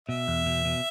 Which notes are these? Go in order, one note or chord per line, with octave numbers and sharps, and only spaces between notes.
B2 E5
E2
B2
B2